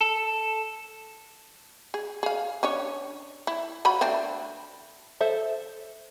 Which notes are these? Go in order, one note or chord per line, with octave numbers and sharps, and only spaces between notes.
A4
G#4
G#4 F5
C#4 D4 C#5
E4
F#3 F4 B5
A3 C4 D4
A4 C5 E5